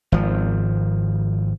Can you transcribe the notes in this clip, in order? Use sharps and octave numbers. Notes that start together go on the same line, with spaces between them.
G#1 F3